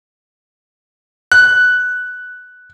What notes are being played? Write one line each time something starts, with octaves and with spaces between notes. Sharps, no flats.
F#6